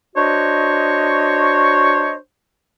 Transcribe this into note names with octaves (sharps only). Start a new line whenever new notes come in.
D4 F#4 C5 C#5 D#5